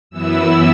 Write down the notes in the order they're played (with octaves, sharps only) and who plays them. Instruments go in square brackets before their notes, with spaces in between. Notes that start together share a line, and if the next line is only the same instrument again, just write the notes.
[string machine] F#2 E3 B3 E4 E6